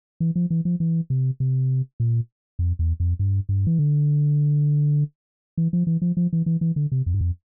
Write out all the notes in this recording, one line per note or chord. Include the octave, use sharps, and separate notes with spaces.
E3
F3
E3
F3
E3
C3
C3
A#2
F2
E2
F2
G2
G2
E3
D3
E3
F3
E3
F3
F3
E3
E3
E3
D3
C3
F2
G2
F2